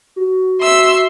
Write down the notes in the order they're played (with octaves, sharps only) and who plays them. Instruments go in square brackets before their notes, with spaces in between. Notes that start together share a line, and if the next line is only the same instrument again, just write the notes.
[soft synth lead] F#4
[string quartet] E5 C6 E6